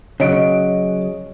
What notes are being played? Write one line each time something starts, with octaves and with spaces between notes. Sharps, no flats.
C#3 F#3 C#5 D#5 D7